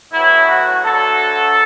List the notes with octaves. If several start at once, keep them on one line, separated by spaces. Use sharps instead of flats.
A2 F#3 B3 E4
F#4
D2 D3 F#3 A4